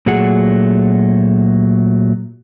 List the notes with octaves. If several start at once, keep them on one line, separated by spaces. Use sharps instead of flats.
A#2 F#3 A3 G#4 F#5